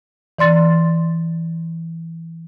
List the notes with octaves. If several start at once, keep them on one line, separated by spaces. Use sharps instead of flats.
E3 D5 C6 A6